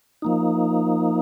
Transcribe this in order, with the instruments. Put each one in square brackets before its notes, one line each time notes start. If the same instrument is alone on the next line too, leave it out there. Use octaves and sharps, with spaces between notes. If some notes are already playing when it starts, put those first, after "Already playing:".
[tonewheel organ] F3 A#3 D#4